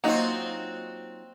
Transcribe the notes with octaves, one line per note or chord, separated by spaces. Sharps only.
F#3 A#3 C4 D#4 F4 F#4